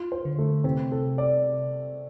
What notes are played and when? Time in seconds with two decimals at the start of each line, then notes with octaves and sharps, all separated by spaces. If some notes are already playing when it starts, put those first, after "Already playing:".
Already playing: F4
0.12 C5
0.25 D3
0.39 A3
0.64 C3 C4
0.92 A4
1.18 D5